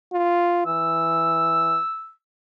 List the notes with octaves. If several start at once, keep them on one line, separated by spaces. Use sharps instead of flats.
F4
E3 E6